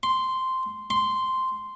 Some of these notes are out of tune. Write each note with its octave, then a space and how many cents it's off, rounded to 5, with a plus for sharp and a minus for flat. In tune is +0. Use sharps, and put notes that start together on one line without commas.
C6 -5
C6 -5